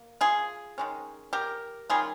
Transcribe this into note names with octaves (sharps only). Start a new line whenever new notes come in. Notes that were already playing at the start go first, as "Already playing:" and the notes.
Already playing: A#3
F4 G#4
D#3 G#3 C#4
G4 A#4
D#3 G3 C#4 F4 G#4